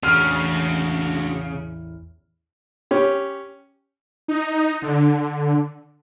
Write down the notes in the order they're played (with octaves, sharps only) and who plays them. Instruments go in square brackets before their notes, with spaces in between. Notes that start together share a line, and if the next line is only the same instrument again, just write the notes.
[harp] A1 E2 E3 [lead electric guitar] C#3 [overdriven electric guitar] D4 F#4 [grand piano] F6
[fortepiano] C#4 G4
[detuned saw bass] D#4
D3